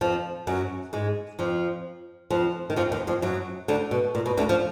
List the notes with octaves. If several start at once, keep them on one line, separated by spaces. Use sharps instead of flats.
F2 F3
F#2 F#3
G#2 G#3
F2 F3
F2 F3
D#3
F2 F3
D#2 D#3
F2 F3
F#2 F#3
D2 D3
B2
A#2
B2
D2 D3
F3